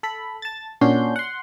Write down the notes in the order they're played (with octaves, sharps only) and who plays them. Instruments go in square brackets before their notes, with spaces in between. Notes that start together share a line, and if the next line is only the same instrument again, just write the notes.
[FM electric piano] A4 B5
A5 A6
A#2 C#4 D4 F#4 C6 G6
F#5 C6